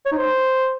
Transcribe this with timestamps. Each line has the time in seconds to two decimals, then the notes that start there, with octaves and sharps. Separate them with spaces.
0.06 C#5
0.12 D#4
0.18 C5